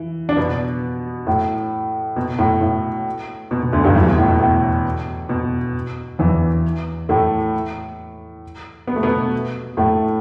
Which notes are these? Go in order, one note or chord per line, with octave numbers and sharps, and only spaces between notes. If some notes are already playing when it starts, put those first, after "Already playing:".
Already playing: E3
D4
B2 B3
A2
B2
A2
A2
B2
B2
D2 D3
G2 G3
E2 E3
B2
A2
B2
A2
B2
E2 E3
A2 A3
B3
A3
B2 B3
A2 A3